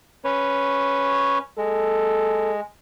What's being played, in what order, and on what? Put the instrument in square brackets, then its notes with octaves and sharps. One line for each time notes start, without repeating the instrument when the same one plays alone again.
[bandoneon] C#4 B4 C#5
[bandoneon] G#3 [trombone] A4